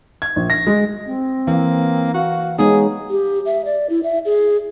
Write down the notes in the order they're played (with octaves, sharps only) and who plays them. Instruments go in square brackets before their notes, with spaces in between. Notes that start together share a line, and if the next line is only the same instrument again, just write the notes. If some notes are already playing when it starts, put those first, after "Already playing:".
[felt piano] G#6
A#1
A#6
G#3
[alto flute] C4
[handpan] E3 [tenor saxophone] A#3
[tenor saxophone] F#4 [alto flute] F5
[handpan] G#3 B3 D#4 [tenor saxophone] G#4 [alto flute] C#5
[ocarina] G4
E5
D5
E4
E5
G#4